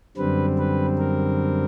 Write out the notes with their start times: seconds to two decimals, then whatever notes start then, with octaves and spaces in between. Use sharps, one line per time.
0.17 F#2 D3 G3 C4 B4
0.58 B4
0.98 A#4